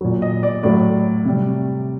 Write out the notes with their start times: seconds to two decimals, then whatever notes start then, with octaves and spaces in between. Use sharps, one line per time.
0.01 A#2 F#3
0.22 D#5
0.43 D5
0.63 A2 F#3 D5
1.25 C3 G3